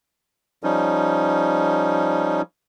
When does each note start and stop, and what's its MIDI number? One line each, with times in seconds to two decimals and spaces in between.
0.64 2.42 53
0.64 2.42 55
0.64 2.42 61
0.64 2.42 63